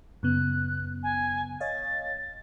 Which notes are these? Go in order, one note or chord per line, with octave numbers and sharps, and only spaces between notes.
F#2 C#3 B3 F#6
G#5
C#5 D#5 F5 A6